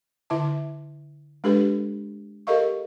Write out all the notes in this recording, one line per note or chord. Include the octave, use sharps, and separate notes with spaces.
D3 E4 E5 A5
G#3 D4 G4 A4 B4
G4 A4 A#4 D#5 F5 C#6